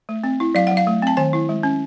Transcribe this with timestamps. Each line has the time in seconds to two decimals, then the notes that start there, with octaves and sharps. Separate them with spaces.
0.09 A3
0.24 C4
0.40 E4
0.55 F#3 F5
0.67 F#3 F#5
0.77 F5
0.87 A3
1.02 C4 A5
1.17 D#3 G#5
1.33 E4
1.49 G#3
1.63 C#4